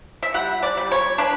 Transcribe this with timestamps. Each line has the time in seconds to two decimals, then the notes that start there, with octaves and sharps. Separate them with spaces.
0.23 E5
0.34 G3 F#5
0.63 D5
0.77 G3
0.91 C#5
1.18 D4 B4